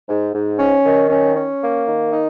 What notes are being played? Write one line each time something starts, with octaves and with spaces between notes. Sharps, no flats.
G#2
G#2
C#4
D#3
C#4
C#4
A#3
D#3
D#4